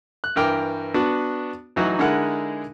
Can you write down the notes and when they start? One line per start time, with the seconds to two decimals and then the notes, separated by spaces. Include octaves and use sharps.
0.24 F#6
0.36 G2 E3 A#4 G5 D6 F6
0.94 B3 D4 F#4
1.76 A1 E3 F#3 D#4 F#4
1.99 D3 G#3 D#4 E4 A#4 F#5